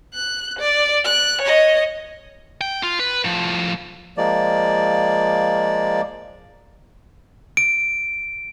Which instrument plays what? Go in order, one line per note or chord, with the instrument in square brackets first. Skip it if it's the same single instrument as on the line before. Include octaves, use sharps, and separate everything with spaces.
[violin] F#6
D5
F#6
C#5 D#5
[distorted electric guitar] G5
F4
B4
A2 F3
[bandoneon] F3 G#3 A#3 D5
[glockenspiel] D7